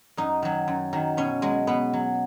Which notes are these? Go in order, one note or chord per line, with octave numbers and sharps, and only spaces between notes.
F#2 D#4
D#3 F#3
F#2
D#3 F#3
B2 C#4
F#3 G#3
B2 B3
F#3